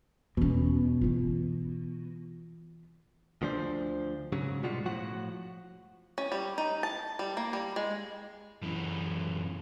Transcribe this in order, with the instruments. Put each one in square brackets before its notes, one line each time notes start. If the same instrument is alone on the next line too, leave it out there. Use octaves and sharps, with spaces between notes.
[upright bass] E2 C#4 [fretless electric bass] B2
[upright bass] E3 F4
[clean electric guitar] D2 F3 D4 C5
G#2 C#3 F#3
B2 G3 G#3 F4 F#4
A2 F3 F#4 F#5
[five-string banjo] C#4
G3
D#4
A5
G3
A#3
G3
G#3
[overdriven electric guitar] F#2 E3